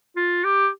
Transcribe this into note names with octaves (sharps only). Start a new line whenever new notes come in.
F4
G4